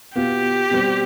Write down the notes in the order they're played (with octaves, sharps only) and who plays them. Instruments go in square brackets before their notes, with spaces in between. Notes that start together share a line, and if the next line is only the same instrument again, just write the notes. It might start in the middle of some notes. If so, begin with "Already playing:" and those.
[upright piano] B2 B3 F4 [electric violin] G4
[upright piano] B2 G3 C4